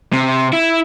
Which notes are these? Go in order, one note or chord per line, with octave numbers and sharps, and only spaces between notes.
C3
E4